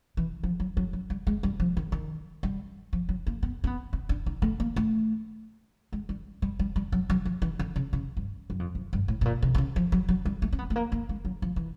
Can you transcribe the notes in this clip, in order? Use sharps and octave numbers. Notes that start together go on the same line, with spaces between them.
E3
F3
F#3
F#3
F#3
G3
G#3
G3
F3
D#3
D#3
G3
F3
F#3
A#3
B3
C4
B3
C4
D4
D#4
A3
A#3
A3
G#3
G3
G3
G3
G3
F#3
F#3
F3
E3
D3
C#3
C#3
G2
F#2
F2
F#2
G2
A2
A2
A#2
C3
D3
C#3
F3
F#3
F#3
G3
A3
C4
B3
A3
A#3
A#3
G#3
F#3
F3
E3